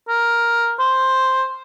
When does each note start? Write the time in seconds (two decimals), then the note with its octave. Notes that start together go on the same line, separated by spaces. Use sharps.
0.08 A#4
0.79 C5